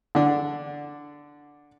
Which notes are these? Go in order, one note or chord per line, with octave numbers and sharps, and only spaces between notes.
D3 D4